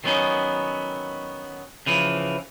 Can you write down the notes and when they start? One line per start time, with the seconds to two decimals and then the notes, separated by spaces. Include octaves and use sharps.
0.04 D#3 F#3 A3 B3 C#4 D#4
1.86 C#3 E3 F3